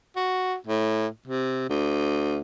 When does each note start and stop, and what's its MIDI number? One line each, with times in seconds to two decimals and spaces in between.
0.16 0.55 66
0.67 1.07 45
1.28 1.68 48
1.69 2.41 38